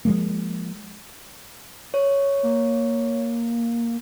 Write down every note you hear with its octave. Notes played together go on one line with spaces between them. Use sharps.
F3 G#3 A#3
C#5
A#3